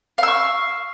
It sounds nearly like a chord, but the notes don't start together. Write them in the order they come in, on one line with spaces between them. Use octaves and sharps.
F5 E6 C#6